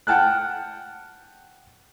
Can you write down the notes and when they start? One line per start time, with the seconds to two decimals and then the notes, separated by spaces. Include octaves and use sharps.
0.07 F#5 G5 A5 F6 F#6